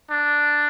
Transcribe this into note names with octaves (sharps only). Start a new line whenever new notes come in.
D4